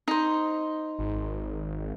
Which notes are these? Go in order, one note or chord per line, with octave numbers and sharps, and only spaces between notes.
D#4 C5
G#1